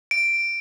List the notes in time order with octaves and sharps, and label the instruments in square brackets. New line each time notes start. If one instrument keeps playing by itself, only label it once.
[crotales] D7